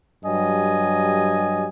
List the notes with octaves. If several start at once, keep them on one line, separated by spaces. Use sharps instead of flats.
G2 F#3 G4 D#5 G#5